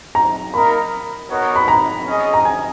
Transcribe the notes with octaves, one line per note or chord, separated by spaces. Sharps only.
A#5
A#3 D#4 A#4 B5
B3 D#4 F#4 A#4 C#5
B5
A#5
C#4 G#4 D#5
A#5
G#5